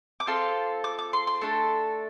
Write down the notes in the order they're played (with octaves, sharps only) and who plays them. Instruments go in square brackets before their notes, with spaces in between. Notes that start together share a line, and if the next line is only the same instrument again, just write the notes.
[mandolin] D6
C4 F4 A4 C6
D6
D6
C6
C6
A3 D4 A4